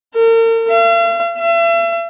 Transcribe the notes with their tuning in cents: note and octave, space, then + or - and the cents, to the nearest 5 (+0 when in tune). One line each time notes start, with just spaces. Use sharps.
A#4 -40
F5 -45
E5 +40